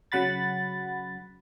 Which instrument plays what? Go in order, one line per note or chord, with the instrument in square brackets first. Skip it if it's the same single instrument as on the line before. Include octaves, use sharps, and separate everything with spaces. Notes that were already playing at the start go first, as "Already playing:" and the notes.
[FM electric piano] C#3 F#3 F#5 B5 A6